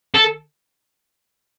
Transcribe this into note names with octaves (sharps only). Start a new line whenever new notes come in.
A4